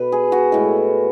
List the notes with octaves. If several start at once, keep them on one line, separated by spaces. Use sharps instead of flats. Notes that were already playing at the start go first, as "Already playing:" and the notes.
Already playing: B2 B4
G#4
F#4
A2 G#3 B3 E4